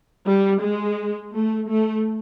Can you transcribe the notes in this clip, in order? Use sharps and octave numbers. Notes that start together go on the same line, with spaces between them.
G3
G#3
A3
A3